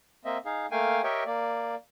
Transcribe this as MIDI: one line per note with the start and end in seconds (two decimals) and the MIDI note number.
0.25 0.38 58
0.25 0.38 60
0.25 0.38 75
0.25 0.38 76
0.45 0.66 63
0.45 0.66 68
0.45 0.66 77
0.71 1.01 57
0.71 1.01 58
0.71 1.01 77
0.71 1.01 79
0.71 1.01 80
1.04 1.23 67
1.04 1.23 70
1.04 1.23 73
1.04 1.23 75
1.04 1.23 76
1.04 1.23 79
1.26 1.75 58
1.26 1.75 74